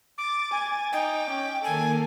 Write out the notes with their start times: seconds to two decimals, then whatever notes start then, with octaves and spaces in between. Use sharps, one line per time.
0.18 D6 A6
0.52 G#5
0.93 D#4 G5 D6
1.30 C#4
1.64 D#3 A#3 A4 G#5